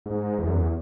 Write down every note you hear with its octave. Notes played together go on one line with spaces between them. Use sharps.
G#2
E2
F#2
E2